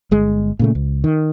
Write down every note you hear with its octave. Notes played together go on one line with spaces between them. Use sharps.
G1 G#3
A#2 C#3 A3
C#2
D#3